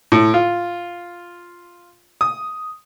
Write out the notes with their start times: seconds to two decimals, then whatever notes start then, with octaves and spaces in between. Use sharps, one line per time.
0.12 A2
0.34 F4
2.21 D#6